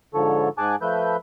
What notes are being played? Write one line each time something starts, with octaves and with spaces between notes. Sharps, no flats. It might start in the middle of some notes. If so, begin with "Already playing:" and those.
G#2 D3 F3 A4 C#5
G#2 G#4 G#5 A5 D6 F#6
F3 A3 B4 E5 G6